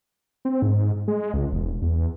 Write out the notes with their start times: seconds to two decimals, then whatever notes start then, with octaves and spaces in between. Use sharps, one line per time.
0.45 C4
0.62 G#2
1.08 G#3
1.34 C#2
1.52 E1
1.82 E2